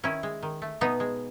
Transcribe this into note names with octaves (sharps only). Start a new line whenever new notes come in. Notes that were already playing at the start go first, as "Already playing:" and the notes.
D#3 C#4 E4
G#3
D#3
A3
B2 B3 D#4
G#3